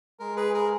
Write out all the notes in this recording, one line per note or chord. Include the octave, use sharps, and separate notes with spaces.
G#3 A#4
G#4 B4
G#4 A#4